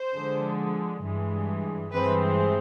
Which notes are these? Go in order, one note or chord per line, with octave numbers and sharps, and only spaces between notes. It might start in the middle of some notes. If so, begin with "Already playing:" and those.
Already playing: C5
D3 F3 G#3
G2 E3 G#3
G2 E3 G#3 C4 B4